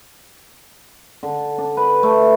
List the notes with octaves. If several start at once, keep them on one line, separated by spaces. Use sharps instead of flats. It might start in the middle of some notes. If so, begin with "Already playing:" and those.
D3
D4
B4
A3